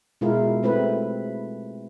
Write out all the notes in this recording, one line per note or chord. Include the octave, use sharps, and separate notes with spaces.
B2 G#3 E4 F4 A#4
A3 C4 E4 B4